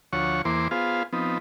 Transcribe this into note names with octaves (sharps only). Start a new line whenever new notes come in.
D2 F3 C#5 F#5 C#6
E2 E3 A#3 C5 C6 D6
B3 F4 G#4 C5 F5
F3 B3 C4 D#4